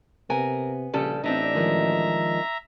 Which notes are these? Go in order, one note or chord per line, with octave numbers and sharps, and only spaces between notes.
C3 B3 A#4 G#5
A#1 C#3 G3 A4
A1 C4 D4 D#4 E5 A#5
D#3 F3 G#3